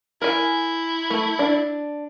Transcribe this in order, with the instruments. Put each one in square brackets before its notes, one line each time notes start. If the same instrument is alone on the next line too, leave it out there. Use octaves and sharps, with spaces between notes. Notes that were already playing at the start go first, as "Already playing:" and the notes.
[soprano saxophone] E4 [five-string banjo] A#4 G#5
[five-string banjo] A3
D4